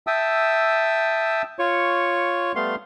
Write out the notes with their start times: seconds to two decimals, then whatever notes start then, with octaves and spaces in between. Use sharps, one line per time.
0.07 E5 G5 A5 D#6 E6
1.59 F4 C#5 C#6
2.55 G3 A3 B3 F5 C6